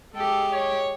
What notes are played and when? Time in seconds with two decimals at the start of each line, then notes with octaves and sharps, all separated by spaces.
0.15 G#3 G4 A4
0.51 C#5